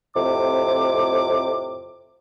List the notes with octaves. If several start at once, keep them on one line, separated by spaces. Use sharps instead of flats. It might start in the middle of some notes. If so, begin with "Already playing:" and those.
F2 A2 C3 D6